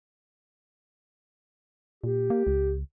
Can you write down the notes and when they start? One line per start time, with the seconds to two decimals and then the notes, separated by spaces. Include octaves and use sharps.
2.04 A#2 G4
2.30 A#3
2.47 C#2